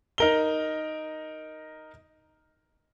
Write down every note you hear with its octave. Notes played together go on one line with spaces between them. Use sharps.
D#4 A#4 G7